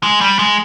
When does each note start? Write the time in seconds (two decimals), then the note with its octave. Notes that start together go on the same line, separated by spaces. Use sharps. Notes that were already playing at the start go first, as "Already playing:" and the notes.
0.03 G#3
0.21 G3
0.39 G#3